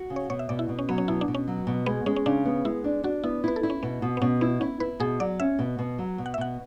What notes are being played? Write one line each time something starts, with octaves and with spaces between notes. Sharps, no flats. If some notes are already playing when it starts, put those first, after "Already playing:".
Already playing: F#4
C#3
C#5
B2 C#5
E5
B2 D5
E4
B2
C#4
F#3 B3
C#4
B2 E4
D4
B2
C#4
F#3
B2
G#3 B3
G#3 C#4
C#4
C#3 D4
B3
G#3 E4
D4
D4 F#4
B3 E4
E4 B4
A4
E4
C#4
B2 B3
B2
B3
B2 C#4
B3 E4
C#4 E4
E4 B4
B2 G#4
F#3 D5
C#4 E5
B2
B2
F#3
B2
F#5
E5
B2 F#5